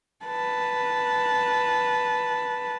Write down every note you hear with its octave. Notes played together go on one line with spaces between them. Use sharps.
B4 A5